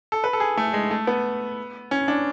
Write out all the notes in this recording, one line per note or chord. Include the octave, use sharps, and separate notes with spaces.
A4
B4
A4
G#4
A3
G#3
A3
B3
C#4
D4